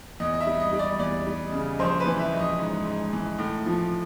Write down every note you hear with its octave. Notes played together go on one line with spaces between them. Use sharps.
E2 D#5
D#5
E5
G3
D#5
G3
D5
E2 D5
G3
C#3
A#1 C5
B4
E3
E5
A#1
D#5
G#2
G#2
E3
A2
F3